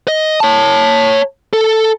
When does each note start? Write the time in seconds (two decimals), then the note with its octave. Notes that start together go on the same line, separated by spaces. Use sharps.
0.08 D#5
0.40 C#5 A5
1.53 A4